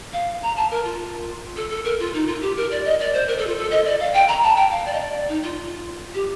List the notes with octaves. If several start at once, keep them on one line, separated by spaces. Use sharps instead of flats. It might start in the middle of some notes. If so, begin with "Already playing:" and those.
F5
A#5
A5
A#4
F4
A4
A4
A#4
F4
D#4
F4
G4
A#4
D5
D#5
D5
C5
A#4
A4
F4
A4
D#5
D5
F5
G5
A#5
A5
G5
F5
D5
D#5
D5
D#4
F4
G4